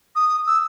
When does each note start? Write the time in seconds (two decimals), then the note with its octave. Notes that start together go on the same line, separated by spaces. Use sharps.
0.16 D#6
0.47 E6